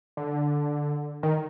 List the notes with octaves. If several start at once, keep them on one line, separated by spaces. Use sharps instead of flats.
D3
D#3